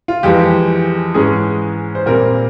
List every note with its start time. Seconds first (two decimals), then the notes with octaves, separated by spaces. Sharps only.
0.08 F4
0.23 F2 E3 G#3 G4
1.14 G#2 E3 G#3 C#4 G#4
1.95 C5
2.06 A#2 G3 C4 A#4